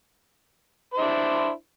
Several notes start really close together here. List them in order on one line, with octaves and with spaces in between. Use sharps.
C5 E4 D4